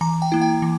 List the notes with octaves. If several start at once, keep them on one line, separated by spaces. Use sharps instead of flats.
E3 A#5
G5
A#3 E4
G5
E3